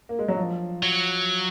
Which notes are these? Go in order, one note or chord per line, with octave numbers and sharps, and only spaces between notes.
A#3
G#3
F#3
F3
F#3